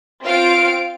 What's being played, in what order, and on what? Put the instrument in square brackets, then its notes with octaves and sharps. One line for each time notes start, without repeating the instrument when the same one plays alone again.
[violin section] C4 F4 F5 D7